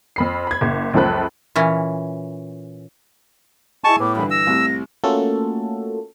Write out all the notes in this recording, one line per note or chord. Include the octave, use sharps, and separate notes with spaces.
F2 B5 C7
B5 G#6
F#1
C#2 F#2 F3 A4 B5 F#6
A#2 E3 C#4
E4 G#4 D#5 G#5 A5 C#6
A2 B3 D6
G2 D3 E3 B5
E6 A#6
C2 A2 C3
A3 A#3 C#4 F4 F#4 A4